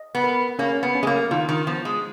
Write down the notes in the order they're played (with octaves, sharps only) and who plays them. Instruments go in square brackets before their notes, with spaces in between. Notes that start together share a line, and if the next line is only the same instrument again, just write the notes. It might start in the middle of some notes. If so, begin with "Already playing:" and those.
Already playing: [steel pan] D#5
[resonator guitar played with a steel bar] B3
[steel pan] A#4
[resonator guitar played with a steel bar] A#3 [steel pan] C#4
[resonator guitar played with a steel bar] B3
[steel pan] C#4
[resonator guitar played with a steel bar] G#3
A#3
[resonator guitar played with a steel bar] D#3 [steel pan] F4
[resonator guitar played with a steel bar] D#3
[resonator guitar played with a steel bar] F3 [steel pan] B3
[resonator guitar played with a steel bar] G#3